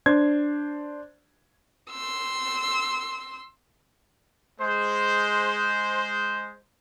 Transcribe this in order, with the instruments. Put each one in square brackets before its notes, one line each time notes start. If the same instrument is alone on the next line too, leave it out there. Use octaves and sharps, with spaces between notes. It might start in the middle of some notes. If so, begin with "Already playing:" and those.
[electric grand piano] D4 C5 G#6
[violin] C6 E6
[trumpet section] G#3 C5